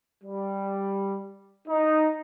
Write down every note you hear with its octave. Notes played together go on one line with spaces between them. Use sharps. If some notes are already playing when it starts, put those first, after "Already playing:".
G3
D#4